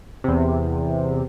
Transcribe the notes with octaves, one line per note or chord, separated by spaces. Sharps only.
E2 C3